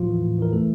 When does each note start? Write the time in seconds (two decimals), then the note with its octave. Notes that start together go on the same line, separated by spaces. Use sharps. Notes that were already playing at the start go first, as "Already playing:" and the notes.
Already playing: A2 F3 F4
0.09 E3
0.23 A2
0.38 E3 A#4
0.53 E3 A3 A4